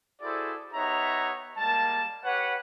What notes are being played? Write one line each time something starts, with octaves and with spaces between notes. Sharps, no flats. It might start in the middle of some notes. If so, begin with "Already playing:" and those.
E4 F#4 G#4 A4 C5 D5
B3 D#4 G4 C#5 E5 A#5
G3 G#3 A#3 A5
G4 B4 C#5 F#5